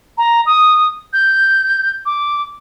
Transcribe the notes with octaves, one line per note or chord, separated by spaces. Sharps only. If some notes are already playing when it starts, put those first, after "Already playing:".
A#5
D#6
G6
D6